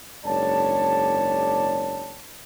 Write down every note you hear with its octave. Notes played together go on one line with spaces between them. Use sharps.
F#1 G#2 D4 C#5 D5 A5